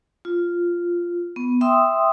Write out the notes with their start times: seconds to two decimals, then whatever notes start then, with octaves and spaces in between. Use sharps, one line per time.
0.25 F4
1.36 B3
1.61 E5 G5 C6 D#6 E6